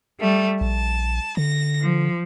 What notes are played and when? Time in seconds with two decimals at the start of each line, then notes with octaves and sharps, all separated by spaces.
0.18 G3 A3
0.61 A#1 A5
1.37 D3 A#6
1.79 F3